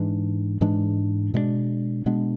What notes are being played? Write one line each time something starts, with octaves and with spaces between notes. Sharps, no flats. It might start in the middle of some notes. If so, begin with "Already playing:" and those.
Already playing: G#2 E3 G#3 D4
G#2 E3 G#3 D4
B2 G#3 B3 D4
B2 G#3 B3 D4